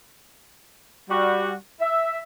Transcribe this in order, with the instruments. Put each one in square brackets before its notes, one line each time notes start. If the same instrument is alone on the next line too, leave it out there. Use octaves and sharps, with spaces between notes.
[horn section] G3 F#4
E5